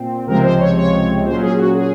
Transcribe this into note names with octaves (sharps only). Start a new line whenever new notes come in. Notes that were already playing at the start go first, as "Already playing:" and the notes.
Already playing: A#2 C4
C#2 C3 F3 G#3 C4 A#4
C5
C#5
C#5
A#2 F#3 C#4 C5
G#4
F#4
G#4